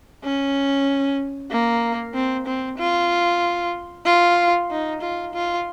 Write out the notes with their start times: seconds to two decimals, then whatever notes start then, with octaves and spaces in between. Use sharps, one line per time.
0.24 C#4
1.50 A#3
2.14 C4
2.46 C4
2.78 F4
4.05 F4
4.70 D#4
5.02 F4
5.34 F4